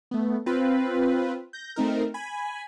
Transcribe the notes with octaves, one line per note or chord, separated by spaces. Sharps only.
A3 B3
C4 F4 B4
G6 A#6
A3 C4 D#4 A#4
G#5 B5